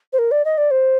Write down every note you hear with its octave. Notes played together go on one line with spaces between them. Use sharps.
C5
A#4
D5
D#5
D5
C5